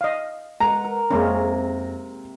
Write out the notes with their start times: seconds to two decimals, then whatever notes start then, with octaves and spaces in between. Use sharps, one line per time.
0.01 D#5 F5
0.60 G#3 B4 F#5 A#5
0.84 A#4
1.10 F2 C3 G#3 A#3 C4 C#4 A#6